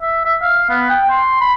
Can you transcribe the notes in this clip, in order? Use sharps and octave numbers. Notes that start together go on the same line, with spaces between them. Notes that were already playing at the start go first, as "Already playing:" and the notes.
E5
E5
F5
B3
G5
C6
B5